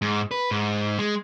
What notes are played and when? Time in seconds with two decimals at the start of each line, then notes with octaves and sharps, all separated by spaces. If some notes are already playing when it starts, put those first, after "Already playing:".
0.02 G#2
0.31 B4
0.51 G#2
0.99 G#3